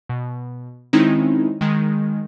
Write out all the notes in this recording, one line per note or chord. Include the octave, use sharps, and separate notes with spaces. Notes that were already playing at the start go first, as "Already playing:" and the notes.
B2
D#3 G#3 C4 C#4 D#4 E4
D#3 G#3